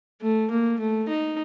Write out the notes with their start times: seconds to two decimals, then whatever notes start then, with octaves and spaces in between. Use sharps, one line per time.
0.22 A3
0.51 A#3
0.80 A3
1.09 D#4